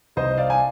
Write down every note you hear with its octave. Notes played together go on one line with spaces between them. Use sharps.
C2 C5 D#5
D5 F5
G#5